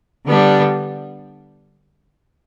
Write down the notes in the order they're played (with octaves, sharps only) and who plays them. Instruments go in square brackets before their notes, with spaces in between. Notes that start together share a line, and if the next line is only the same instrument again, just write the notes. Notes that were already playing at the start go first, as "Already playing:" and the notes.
[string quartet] D3 G3 B3 D4